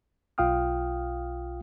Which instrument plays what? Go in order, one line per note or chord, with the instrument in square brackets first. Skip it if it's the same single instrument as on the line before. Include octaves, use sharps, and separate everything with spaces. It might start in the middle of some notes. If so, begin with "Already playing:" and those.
[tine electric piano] B1 F4 F5 G5 D#6 F6